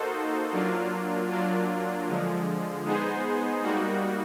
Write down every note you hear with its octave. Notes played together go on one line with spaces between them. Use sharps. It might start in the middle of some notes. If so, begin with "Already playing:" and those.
Already playing: A#3 D#4 F#4 A4 C5
F#3 A#3 D4 F4
F#3 A#3 D4 F4
D3 F3 G#3
G#3 B3 D#4 G#4 C5
G3 A#3 D#4 F#4